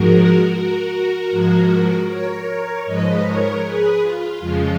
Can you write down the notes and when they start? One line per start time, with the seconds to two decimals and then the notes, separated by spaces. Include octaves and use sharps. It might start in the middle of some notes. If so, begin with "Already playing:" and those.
Already playing: G#2 F3 G#3 F#4 A#4
0.52 F#4 A#4
0.91 F#4 A#4
1.30 G#2 F3 G#3
2.08 A#4 C#5
2.85 G#2 F3 G#3 B4 D#5
3.24 A#4 C#5
3.63 G#4 B4
4.01 F4
4.40 F2 C#3 F3 G#3